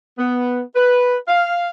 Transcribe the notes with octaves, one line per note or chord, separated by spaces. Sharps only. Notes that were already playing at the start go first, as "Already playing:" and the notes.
B3
B4
F5